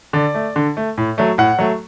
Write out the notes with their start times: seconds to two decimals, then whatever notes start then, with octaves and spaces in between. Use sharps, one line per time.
0.13 D3 D5
0.34 A3
0.56 D3
0.77 A3
0.98 A2
1.18 F#3 A3
1.38 A2 F#5
1.59 F#3 A3